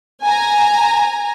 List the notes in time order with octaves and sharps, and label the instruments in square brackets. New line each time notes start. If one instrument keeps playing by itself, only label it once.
[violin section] G#5 A#5